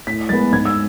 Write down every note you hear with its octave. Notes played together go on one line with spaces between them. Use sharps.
A2 B6
G#3 B3 A6
G#2 G#6
E6